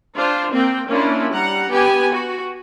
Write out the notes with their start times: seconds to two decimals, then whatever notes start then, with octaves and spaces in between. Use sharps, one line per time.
0.16 D4 F4 C5
0.52 A#3 C4 G5
0.87 A#3 C#4 D4 E4 F4
1.32 G3 F#5 A#5
1.70 B3 G4 G5 G#5
2.11 F#4